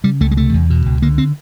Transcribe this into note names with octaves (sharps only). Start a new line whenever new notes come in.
C#3 G3
C#2 A3
G#3
C3 A3
E2
B2
C#2
D3 A#3
C4